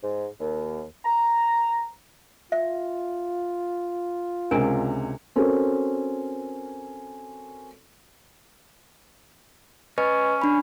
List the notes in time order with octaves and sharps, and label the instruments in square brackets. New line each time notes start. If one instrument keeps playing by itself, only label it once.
[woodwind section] G#2
D#2
A#5
[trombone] F4 [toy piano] E5
[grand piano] C#2 C3 [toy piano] D4 A#4 G#5
[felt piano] C4 C#4 F#4 A4 A#4
[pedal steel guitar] C#4 [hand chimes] B4 D#5
[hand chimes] D4 B5